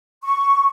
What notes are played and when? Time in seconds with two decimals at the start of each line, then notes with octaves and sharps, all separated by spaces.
0.23 C#6